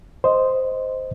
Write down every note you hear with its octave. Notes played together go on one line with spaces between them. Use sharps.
C5 D#5